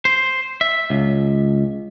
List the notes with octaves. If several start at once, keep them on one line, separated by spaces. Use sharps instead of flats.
C5
E5
C#2